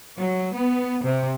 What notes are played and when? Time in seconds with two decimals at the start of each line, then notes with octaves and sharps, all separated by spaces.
0.17 F#3
0.53 B3
1.05 C3